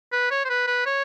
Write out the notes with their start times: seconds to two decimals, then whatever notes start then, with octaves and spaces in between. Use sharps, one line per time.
0.13 B4
0.31 C#5
0.45 C5
0.49 B4
0.67 B4
0.86 C#5